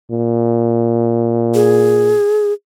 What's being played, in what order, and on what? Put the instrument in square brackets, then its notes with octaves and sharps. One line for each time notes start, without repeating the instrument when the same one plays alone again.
[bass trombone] A#2
[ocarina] G#4